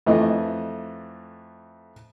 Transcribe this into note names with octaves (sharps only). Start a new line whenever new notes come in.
F2 E3 A3 D#5